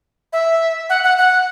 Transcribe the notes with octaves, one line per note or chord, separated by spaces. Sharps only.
E5
F#5
F#5
F#5